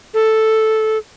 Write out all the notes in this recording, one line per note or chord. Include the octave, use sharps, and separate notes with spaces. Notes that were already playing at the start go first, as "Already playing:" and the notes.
A4